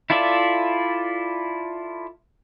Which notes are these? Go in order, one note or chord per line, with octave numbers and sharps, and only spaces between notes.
E4 F4 A4 D5 E5